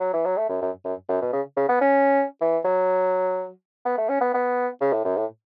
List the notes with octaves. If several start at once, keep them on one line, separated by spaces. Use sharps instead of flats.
F#3
E3
F#3
A3
F#2
F#2
F#2
F#2
B2
C#3
C#3
B3
C#4
E3
F#3
B3
A3
C#4
B3
B3
C#3
A2
F#2
A2